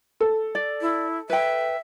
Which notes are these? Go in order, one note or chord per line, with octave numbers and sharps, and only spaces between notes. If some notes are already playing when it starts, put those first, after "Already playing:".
A4
D5
E4
B4 E5 G5